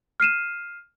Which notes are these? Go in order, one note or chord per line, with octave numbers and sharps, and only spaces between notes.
F6 C7 D#7 E7